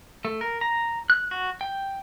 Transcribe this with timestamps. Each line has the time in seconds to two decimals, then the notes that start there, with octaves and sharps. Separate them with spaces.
0.25 A3
0.41 A#4
0.61 A#5
1.10 F#6
1.31 F#4
1.61 G5